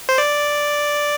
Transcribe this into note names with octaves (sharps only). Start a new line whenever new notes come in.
C5
D5